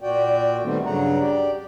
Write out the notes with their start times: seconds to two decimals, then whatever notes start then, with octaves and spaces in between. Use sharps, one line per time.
0.01 A#2 F#4 D5 G5
0.63 D#3 G3 A3 B3 C4
0.86 G2 C#3 F#3 F#5 A#5
1.20 G4 D5